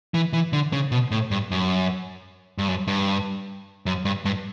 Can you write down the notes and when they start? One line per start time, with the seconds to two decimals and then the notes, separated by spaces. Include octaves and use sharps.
0.14 E3
0.33 E3
0.53 D3
0.73 C#3
0.92 B2
1.11 A2
1.31 G2
1.51 F#2
2.58 G2
2.68 F#2
2.87 G2
3.86 F#2
4.05 G2
4.25 G2